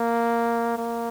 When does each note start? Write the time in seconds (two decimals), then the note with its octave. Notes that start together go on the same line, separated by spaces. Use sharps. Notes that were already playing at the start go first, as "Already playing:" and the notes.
Already playing: A#3
0.78 A#3